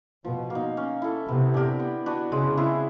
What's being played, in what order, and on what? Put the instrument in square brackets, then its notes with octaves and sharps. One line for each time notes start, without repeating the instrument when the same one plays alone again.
[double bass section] B2 [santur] F3
[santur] A#3
D#4
C#4
E4 A4
[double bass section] C3 [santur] B3
[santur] D4 G4 A#4
B3
D4 F#4 B4
[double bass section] C#3 [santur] G#3
[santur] C4 E4 G#4